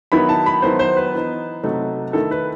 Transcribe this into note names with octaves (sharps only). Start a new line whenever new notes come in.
D#3 F#3 B3 E4 B5
A5
B5
D#3 F#3 B3 E4 C5
C5
B4
E3 B3 D#4
C3 F#3 A3 D#4
D#3 A3 E4 A4
B4